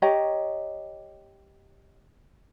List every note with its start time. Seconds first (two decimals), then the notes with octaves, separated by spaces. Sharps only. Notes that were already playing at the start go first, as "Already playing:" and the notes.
0.02 G4 C#5 D#5 A#5